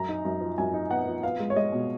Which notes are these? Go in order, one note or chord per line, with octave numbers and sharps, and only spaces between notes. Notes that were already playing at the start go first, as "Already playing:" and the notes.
Already playing: F#2 A#5
D#4
F#2
F3
F#2 G#5
D#4
B3 F#5
F3
B3 F5
G#3
C#5
G#3 D#5
B2